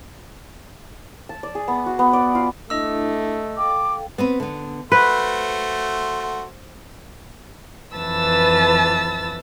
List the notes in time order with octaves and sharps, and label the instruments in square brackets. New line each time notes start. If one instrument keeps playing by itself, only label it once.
[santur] A5
D5
G#4
B3
F#4
B3
D5
F4
[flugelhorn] A3 [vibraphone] D4 E4 [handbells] D#5 E6
[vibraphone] A4 F5 G5 [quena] D6
[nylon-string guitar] B3 C4 B4
D3 B3
[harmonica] A3 F#4 C6 [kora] B4 [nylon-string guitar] C5
[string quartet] F2 E3 B4 A5 E6 A6